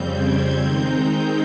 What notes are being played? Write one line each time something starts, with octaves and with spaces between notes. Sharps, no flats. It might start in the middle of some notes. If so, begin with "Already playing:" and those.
Already playing: F2 C#3 G3 C4 G6
G#6
D#3 G#3 C4 D#4 G6